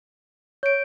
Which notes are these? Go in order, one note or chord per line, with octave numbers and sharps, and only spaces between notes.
C#5 G6 D7